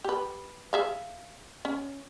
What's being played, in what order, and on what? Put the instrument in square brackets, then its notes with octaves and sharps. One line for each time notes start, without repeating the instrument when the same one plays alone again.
[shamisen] G4 B4
G#4 E5 F5
C#4